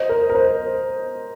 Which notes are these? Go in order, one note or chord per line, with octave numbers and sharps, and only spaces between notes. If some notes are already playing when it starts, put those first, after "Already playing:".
Already playing: C5 D#5
A#4
A#4
C5